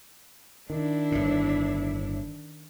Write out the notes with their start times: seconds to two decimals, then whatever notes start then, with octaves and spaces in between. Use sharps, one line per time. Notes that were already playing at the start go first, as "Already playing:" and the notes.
0.70 D#3 D4 E4
1.12 G1 A2